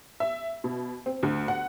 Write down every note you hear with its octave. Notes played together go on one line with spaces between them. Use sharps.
E5
B2
C4
D2
F#5